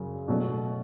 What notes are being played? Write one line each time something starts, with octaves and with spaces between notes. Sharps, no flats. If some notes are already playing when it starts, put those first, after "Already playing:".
Already playing: F#2 C#3 F#3
B2 F#3 A3